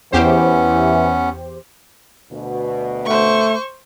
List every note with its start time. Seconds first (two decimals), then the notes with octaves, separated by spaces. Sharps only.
0.12 E2 E3 B3 C#4 G4 C5
2.31 D2 B2
3.06 A3 C5 C#6